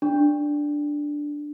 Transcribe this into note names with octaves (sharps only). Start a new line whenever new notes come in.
D4